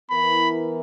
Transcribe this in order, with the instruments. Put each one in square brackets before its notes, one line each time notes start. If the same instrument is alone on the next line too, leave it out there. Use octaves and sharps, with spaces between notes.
[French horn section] E3 B3 E4 A#4 [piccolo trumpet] B5